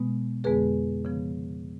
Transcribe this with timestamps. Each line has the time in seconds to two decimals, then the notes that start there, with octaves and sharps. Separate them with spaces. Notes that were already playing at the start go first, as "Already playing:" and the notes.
Already playing: B2 G#3 B3
0.44 F2 D3 G#3 B3 G#4 B4
1.05 C#3 F3 B3